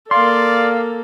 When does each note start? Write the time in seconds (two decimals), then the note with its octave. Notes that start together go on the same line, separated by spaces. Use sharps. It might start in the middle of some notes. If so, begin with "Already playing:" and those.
0.11 A#3 A4 D5 F5 C6